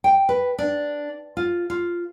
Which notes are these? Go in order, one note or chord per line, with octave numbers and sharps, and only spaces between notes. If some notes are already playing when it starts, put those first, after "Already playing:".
G5
B4
D4
F4
F4